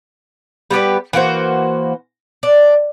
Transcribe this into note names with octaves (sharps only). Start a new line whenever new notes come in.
G3 B3 G4 B4
E3 A#3 F#4 C5
D4